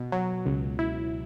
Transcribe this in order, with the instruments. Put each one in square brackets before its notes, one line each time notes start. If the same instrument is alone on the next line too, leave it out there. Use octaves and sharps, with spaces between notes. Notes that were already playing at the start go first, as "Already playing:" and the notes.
Already playing: [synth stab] B2
F#3
C#2
E4